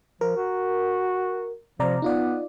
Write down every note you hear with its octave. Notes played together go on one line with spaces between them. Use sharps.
F3 A#4
F#4
C3 F3 D5 A#5
B3 D#4 F4 D5